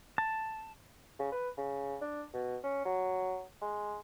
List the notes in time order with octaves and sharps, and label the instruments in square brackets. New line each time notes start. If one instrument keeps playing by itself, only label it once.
[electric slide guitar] A5
[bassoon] C#3
B4
C#3
D4
B2
C#4
F#3
G#3